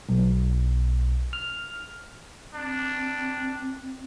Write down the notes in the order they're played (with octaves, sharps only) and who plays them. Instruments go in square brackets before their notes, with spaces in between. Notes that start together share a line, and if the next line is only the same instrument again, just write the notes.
[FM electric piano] B1
F6
[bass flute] C4 [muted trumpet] D4